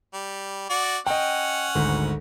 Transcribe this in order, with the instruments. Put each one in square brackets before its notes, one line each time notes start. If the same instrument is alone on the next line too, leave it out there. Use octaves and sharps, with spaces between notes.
[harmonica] G3
F#4 D5
[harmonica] C#4 F#5 [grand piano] D#5 G5
[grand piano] G#1 D2